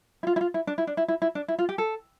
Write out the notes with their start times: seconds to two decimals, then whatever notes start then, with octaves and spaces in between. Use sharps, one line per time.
0.23 E4
0.27 F4
0.36 E4
0.41 F4
0.54 E4
0.67 D4
0.78 E4
0.87 D4
0.97 E4
1.08 E4
1.22 E4
1.35 D4
1.48 E4
1.59 F4
1.69 G4
1.78 A4